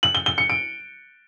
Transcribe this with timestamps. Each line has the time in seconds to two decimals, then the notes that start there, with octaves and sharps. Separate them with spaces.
0.03 F#7
0.15 G7
0.26 G7
0.38 C#7
0.50 D7